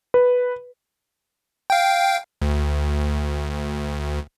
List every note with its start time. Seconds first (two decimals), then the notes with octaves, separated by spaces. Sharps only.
0.14 B4
1.70 F5 G5
2.42 D2